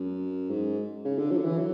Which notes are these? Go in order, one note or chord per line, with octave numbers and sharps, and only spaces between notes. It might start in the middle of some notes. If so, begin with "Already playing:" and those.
Already playing: F#2
G#2
C#3
D3
F#3
D3
E3
F#3